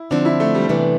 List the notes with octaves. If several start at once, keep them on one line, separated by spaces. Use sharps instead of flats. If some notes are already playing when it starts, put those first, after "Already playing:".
Already playing: E4
D3 F3 C4 D4
E4
A3
G3
C3 E3 A3 B3 D4